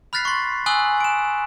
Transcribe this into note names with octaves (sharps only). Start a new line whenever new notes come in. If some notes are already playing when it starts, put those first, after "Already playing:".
B5 F6 F#6 A6 B6 C7
C6 C#6
G#5 C#6 D#6 E6 F#6 F#7
D7 E7